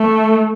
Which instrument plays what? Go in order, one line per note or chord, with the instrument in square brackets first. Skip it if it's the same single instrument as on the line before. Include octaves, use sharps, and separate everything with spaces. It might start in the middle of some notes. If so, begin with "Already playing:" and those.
Already playing: [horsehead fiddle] A3